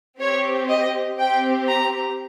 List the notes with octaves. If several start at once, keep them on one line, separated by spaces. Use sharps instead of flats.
C4 G4 C#5
D#5
C4 G4 G5
A#5